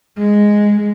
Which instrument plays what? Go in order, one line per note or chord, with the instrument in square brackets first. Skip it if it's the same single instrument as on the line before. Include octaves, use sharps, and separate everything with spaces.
[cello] G#3